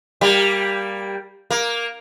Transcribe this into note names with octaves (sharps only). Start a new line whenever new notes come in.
G3 A#3
A#3